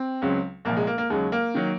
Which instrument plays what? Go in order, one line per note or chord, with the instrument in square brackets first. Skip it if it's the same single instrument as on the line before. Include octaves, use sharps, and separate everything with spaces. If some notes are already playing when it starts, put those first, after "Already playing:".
Already playing: [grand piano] C4
C#2 C#3 F#3
C2 A#2 F3 A#3
G#3
A#3
A#3
D#2 C#3 F#3 G#3
A#3
D#3 F#3